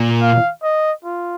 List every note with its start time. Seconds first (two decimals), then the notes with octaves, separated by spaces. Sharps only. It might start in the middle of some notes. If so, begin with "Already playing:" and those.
Already playing: A#2
0.21 F5
0.63 D#5
1.04 F4